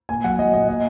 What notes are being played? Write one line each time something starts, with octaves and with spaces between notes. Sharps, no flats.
A#2 G#5
F#3 F#5
F#3 D#5
A#2 D#5
A#2 D#5